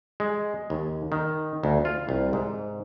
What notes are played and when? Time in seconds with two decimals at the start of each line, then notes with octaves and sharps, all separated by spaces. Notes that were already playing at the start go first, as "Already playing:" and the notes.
0.20 G#3
0.70 D#2
1.12 D#3
1.63 D2
1.85 F4
2.09 C2
2.33 G#2